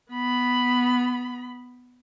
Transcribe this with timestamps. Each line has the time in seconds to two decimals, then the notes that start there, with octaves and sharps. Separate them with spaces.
0.11 B3 B5